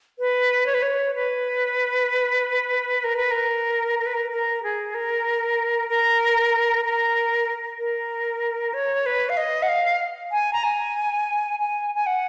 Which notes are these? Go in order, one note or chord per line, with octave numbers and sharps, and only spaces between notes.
B4
C#5
B4
C#5
B4
A#4
B4
A#4
A#4
B4
A#4
A#4
G#4
A#4
A#4
A#4
A#4
C#5
B4
F5
D#5
F#5
F5
G#5
A#5
G#5
G#5
G#5
F#5